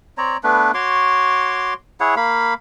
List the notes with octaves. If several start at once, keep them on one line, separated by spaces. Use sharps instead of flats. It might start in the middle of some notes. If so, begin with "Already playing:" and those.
C4 C#5 D5 A#5
A3 B3 D4 B4
F#4 C#5 C6 D6
E4 G#4 C#5 F#5
A#3 F5 B5